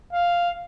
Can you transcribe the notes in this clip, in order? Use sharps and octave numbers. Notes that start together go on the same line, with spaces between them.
F5